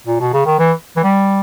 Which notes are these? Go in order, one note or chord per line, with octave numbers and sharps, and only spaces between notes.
A#2
B2
C#3
D#3
E3
E3
G3